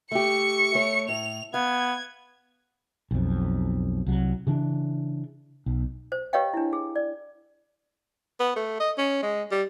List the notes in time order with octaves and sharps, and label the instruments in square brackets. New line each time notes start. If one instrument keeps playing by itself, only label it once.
[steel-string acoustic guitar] A3 G4 [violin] C#6 C#7
[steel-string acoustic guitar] A3 C#5
[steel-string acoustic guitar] A2 [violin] F7
[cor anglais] B3 [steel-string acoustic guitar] F5 [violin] G#6
[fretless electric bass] B1 F2
C2 F#3
C#3 E3 D4
B1
[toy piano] C5
G4 B4 C#5 D#5 F5 G5
D4 E4
G#4
D5
[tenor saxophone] B3
A3
D#5
C#4
G#3
G3